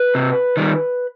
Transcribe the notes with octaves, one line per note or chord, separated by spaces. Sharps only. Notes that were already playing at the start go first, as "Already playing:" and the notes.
Already playing: B4
C3
D#3 G3